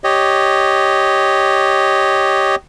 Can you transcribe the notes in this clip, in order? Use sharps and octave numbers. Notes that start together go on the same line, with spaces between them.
G4 C#5 D#5